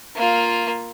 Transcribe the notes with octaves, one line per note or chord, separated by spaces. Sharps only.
A#3 F4